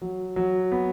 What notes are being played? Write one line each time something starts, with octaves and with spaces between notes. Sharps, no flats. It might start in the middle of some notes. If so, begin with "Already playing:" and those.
F#3
F#3
B3